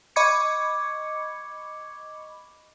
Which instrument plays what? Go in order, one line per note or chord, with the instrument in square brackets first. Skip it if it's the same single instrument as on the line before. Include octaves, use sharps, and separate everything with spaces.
[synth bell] D#5 B5 C#6 D6 G#6 C#7